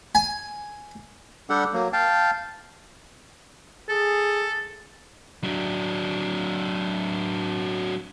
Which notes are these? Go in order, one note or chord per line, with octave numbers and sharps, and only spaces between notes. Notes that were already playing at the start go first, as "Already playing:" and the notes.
G#5
G3 D4 G4 A4 F#5
F#3 A#3
F5 G5 A5
G#4 A4
F#3 D4